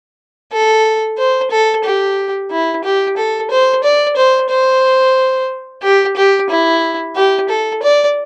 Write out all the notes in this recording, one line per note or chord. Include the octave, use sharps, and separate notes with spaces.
A4
C5
A4
G4
E4
G4
A4
C5
D5
C5
C5
G4
G4
E4
G4
A4
D5